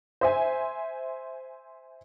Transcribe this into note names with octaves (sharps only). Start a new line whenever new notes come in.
C5 E5 G#5